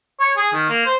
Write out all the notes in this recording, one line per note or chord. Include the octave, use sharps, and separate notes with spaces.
C#5
G#4
D#3
A#3
C5